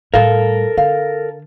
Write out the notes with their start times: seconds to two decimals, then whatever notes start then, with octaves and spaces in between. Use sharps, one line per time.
0.14 A2 G3 A4 A#4 F5
0.77 D3 F5